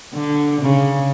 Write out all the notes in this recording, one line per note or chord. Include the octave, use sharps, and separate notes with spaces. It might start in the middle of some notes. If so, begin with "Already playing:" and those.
D3
C#3